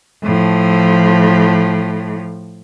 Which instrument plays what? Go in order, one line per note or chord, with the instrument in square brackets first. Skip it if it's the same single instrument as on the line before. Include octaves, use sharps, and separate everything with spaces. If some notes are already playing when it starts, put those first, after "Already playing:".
[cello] A2 F3